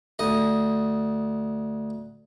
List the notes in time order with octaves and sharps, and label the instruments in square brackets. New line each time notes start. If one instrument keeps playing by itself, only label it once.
[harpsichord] D2 D#5